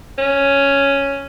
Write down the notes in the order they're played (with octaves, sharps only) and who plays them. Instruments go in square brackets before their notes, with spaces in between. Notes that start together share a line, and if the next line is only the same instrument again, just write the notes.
[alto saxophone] C#4